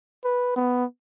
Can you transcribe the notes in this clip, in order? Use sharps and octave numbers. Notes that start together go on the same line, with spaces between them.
B4
B3